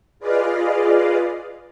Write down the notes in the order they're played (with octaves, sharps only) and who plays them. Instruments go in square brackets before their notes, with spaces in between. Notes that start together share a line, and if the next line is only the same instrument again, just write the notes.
[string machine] F4 G#4 B4 D5 D#5 F5